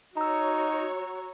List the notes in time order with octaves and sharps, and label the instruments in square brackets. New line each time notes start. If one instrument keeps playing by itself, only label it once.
[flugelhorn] D#4 [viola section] F#4 C#5 [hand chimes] A#5 E6